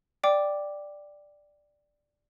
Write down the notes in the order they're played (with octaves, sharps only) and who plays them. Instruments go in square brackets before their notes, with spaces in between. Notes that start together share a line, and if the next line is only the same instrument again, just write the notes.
[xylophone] D5 G5 D6